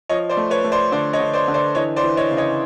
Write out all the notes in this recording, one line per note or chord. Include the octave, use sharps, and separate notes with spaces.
F3 C#5 D#5
C5 D5
A3
B4 C#5
A3
C5 D5
D3 C5 D5
C#5 D#5
D3
C5 D5
D3
C5 D5
E3 C#5 D#5
C5 D5
E3
C#5 D#5
C#3
C#5 D#5